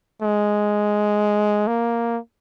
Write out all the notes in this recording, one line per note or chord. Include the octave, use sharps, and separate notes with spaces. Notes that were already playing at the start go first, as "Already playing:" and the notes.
G#3
A#3